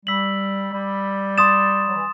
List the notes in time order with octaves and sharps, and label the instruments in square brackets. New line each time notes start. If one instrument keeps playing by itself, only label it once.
[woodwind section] G3 [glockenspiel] E6 B6 F#7
[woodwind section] G3
[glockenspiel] C6 D#6 A6 E7
[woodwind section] F#3
E3